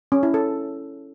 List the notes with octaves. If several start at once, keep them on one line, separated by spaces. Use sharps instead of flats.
C#4
E4
A4